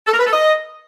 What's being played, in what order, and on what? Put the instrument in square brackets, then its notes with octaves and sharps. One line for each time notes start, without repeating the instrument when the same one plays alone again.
[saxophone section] A4
A#4
B4
A4
D#5